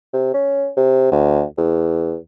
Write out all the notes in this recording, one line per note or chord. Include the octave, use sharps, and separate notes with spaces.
C3
C#4
C3
D2
E2